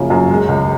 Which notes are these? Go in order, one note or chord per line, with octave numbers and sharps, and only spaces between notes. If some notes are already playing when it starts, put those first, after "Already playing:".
Already playing: F#2 C#3 F3 A#3
F#2
G#3
C#2